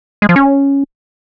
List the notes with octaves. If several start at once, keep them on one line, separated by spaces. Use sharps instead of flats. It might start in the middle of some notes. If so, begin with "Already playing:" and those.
G#3
F3
C#4